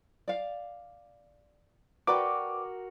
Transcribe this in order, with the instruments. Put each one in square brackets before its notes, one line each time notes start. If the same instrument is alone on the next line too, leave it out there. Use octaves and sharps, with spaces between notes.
[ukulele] D5 F5
[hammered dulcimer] F#4 A#4 [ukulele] B4 D5 G5 [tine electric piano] D6